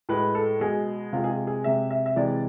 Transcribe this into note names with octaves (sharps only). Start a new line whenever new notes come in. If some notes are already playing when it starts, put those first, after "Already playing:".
A2 G#3 B4
A4
B2 G#3 G#4
C3 G#3 F4
G#4
F4
G#4
C3 G#3 E5
E5
E5
C3 E3 G#3 D5